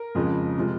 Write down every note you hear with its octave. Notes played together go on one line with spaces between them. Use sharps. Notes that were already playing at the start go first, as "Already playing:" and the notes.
Already playing: A#4
F2 C#3 F3 G#3
C3 F3 G#3